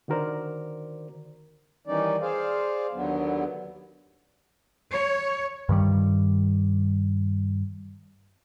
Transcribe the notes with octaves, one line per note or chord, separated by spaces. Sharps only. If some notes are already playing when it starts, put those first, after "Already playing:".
D3 D#3 F#4 A#4 C5 D5
D#3 E3 G3 C#4 D#4 D5
G#4 C5 D5 F5
D#2 D3 F#3 B3
C#5
G2 D#3 G3